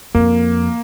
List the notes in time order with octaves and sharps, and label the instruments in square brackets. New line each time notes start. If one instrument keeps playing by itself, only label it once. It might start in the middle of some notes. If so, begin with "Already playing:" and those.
[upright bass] F2 [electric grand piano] A#3